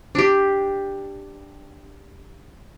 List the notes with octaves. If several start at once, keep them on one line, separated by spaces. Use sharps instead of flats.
D4 G4